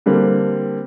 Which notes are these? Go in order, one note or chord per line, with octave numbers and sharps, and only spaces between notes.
D3 G3 A#3 C4